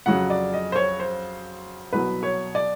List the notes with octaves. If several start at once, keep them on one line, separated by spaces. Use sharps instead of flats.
F2 C#3 F#3 F#5
D5
D#5
C5
C#5
C5
C2 B2 F#3 B4
C#5
D5